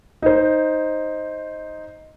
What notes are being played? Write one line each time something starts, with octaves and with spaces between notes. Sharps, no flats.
D#4 C5